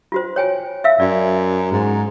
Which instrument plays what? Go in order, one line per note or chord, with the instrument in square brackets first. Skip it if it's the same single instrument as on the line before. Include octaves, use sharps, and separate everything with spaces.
[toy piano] F4 F#4 C5
C#5 G5 G#5
E5 F5 E6
[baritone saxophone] F#2 [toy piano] D5
[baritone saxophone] G#2